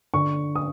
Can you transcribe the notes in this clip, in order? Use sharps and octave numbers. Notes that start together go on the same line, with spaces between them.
D3 C#6
D#6